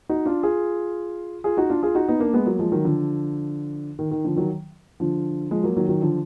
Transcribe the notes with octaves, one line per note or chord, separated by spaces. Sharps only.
D#4 F#4
D4 F4
F4 G#4
F4 G#4
D#4 F#4
D4 F4
F4 G#4
D#4 F#4
B3 D#4
A#3 D4
G#3 B3
F#3 A#3
F3 G#3
D#3 F#3
D3 F3
D#3
D#3
D3 F3
D#3 F#3
D3 F3
F3 G#3
F#3 A#3
D#3 F#3
D#3 F#3
D3 F3